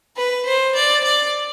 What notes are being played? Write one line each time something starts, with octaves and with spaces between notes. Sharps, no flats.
B4
C5
D5
D5